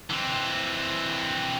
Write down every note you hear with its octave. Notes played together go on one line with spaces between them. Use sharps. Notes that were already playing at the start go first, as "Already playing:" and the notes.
E3 C4